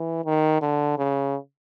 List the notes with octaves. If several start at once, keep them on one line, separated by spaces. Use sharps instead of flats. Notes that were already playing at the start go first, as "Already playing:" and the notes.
Already playing: E3
D#3
D3
C#3